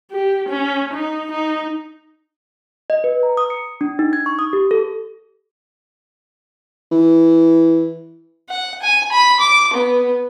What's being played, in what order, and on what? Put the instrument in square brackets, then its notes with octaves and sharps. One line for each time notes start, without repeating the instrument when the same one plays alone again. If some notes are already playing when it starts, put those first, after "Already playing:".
[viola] G4
C#4
D#4
D#4
[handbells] D#5
B4
A#5
D#6
C#7
D4
D#4
G#6
C#6
D#6
G4
A4
[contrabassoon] E3
[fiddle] F#5
G#5
B5
D6
B3